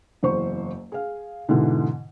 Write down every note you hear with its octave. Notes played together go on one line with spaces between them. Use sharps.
F#1 E2 C5 C#6
G#4 F5
G#2 B2 D3 E3